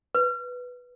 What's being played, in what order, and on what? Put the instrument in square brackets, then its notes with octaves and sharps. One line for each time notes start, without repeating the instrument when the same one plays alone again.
[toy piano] B4